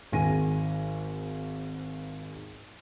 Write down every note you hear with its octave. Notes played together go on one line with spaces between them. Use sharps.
G#1 G#2 G#5 A#6 D#7